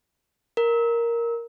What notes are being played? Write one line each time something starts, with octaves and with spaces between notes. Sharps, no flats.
A#4